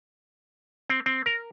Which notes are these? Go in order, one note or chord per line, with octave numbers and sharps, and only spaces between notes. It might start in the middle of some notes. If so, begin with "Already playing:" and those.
C4
C4
A#4